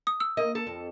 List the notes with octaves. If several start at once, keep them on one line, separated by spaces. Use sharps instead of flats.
D#6
E6
A#3 D#5
A4
F2